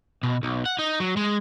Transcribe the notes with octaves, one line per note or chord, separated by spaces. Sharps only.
B2
B1
F#5
D#4
F#3
G#3